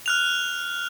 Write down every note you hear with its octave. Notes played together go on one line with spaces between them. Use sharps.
F6 F#6 F7